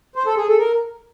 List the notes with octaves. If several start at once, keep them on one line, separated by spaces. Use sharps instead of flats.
C5
A4
G#4
A4
A#4